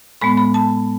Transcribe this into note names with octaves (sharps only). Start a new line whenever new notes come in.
A2 G#3 B3 B5
B5
A5